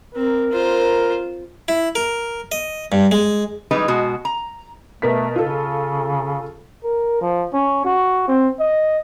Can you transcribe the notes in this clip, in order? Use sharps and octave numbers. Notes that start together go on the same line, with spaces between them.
C4 A#4
F4 C5
E4
A#4
D#5
G2
G#3
E3 G3 G#3 D#4 B4
B2 G#3 F#4
A#5
B2 A3 A#4 B6
C#3 F4 A4
A#4
F3
C#4
F#4
C4
D#5